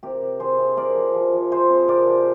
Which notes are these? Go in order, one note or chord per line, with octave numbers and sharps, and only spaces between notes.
C3 G4 A#4
C3
C3 G#4 C5
C3
C3 A#4 D5
F3
F3
F3
C3 G#4 C5
C3
C3 A#4 D5
F3